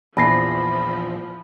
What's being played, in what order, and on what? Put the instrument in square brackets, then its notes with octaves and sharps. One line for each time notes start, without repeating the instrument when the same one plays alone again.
[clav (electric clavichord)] A#1 E2 [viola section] E3 F3 [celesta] A5 A#6 C7 [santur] B5